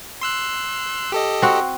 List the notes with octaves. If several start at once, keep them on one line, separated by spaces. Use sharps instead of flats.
C6 E6 F#6
G4 A4 D#5
C4 F#4